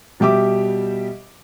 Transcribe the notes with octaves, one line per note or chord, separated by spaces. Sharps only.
B2 G3 G4 E5 D6